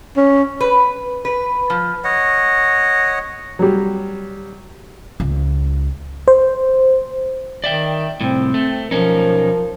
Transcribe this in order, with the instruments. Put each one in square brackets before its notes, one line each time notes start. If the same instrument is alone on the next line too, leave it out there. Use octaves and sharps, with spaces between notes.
[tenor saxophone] C#4
[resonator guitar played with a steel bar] B4
B4
F3
[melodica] C#5 D#5 F#5
[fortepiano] F#3 G3
[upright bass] C#2
[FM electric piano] C5
[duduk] D#3 [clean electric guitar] D5 E5 G5
[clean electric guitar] C2 A2 [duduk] C4
[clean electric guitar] A3
[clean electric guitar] B1 C#4 D#4 [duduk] F3 [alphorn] A#4